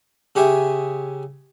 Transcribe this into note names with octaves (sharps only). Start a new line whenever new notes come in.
C#3 G4 G#4 E5